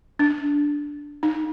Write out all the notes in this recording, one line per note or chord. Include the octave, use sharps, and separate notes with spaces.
D4
D#4